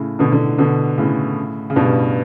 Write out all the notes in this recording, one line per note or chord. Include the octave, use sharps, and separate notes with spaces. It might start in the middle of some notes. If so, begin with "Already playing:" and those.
Already playing: A2 C#3
B2 D3
B2 D3
B2 D3
A2 C#3
C#3
G2 B2